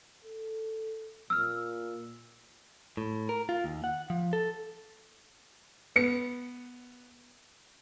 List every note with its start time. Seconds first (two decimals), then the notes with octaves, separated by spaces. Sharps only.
0.24 A4
1.30 A#2 E6 F6
2.97 A2
3.29 A#4
3.49 F4
3.64 D#2
3.84 F#5
4.10 F3
4.33 A4
5.96 B3 C#7